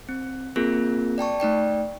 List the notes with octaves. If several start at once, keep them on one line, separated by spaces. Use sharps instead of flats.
C4
A#3 C4 F4 G#4 A#4
D5 G5 A5 C#6
A3 D#4 D5 G5